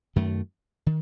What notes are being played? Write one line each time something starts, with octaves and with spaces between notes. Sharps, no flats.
F#2 D#3 A3
D#3